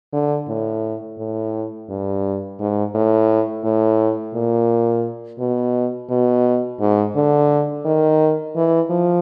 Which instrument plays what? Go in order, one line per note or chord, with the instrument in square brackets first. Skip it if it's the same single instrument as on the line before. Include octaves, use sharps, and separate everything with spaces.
[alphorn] D3
A2
A2
G2
G#2
A2
A2
A#2
B2
B2
G#2
D3
D#3
E3
F3